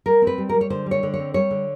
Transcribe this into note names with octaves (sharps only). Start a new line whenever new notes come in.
G3 A#4
C4
B4
G3
G3 A#4
C#5
D3 C5
G3 C#5
D3
C#5
C4
G3 C#5
D3